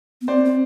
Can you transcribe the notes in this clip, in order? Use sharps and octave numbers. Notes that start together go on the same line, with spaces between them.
B3
C4 C5 D5
C4